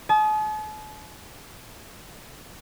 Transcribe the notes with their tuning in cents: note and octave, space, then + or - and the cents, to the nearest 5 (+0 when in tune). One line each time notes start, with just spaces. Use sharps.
A5 -45 D#6 +0